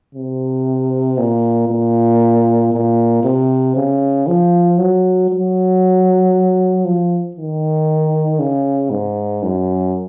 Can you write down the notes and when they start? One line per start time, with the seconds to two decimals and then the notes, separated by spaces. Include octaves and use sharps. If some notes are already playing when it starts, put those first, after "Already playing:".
0.15 C3
1.18 A#2
1.69 A#2
2.73 A#2
3.23 C3
3.76 C#3
4.27 F3
4.78 F#3
5.29 F#3
6.85 F3
7.36 D#3
8.39 C#3
8.90 G#2
9.43 F#2